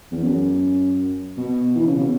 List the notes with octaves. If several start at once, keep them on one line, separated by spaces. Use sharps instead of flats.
E2
F#2
B2
E3
C#3
B2